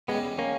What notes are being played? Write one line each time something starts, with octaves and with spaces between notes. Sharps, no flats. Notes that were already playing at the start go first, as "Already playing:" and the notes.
E2 C#3 G3 G#3 B3
A#3 C#4